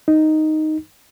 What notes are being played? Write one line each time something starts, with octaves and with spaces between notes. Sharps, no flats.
D#4